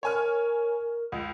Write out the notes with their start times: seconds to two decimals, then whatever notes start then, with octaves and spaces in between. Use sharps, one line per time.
0.03 A#4 C#5 G#5 F6
1.12 C#2